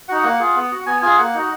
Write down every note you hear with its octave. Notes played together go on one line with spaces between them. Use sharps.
D#4 F#4 F#5
A#3 F#5
F4 G#4
B3
F#4
B3 G#5
F4 G#4 G#5
A#3 F#5
D#4 F#4